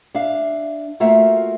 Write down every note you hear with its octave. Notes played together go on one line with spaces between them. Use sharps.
D4 E5 F5
A3 A#3 F4 F#4 E5